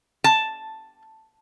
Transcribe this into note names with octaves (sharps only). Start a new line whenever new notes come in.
A5